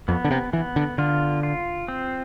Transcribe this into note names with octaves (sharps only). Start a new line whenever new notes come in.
F2 B3
D3
C3
E3 B3
D3
D3 F4
F4
C4